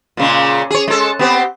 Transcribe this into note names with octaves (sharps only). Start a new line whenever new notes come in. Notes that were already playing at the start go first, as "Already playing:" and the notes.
A#2 C#3 G#3
G#4 C#5
G#3 A4
B3 C4 G4